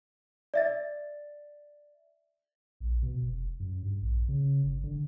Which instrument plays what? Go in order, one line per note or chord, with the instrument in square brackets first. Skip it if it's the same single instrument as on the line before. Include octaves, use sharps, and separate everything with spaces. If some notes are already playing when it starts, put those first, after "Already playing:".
[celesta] D5 E5 A6
[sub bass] A#1
B2
F1
F#2
G2
A#1
C#3
G1
D3